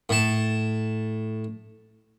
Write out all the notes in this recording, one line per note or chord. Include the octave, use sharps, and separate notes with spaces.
A2 A5